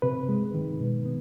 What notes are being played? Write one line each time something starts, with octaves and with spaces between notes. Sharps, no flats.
C3 B4
G#3
D#3
B2
B3